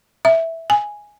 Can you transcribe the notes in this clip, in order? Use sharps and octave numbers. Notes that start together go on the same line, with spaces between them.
E5
G#5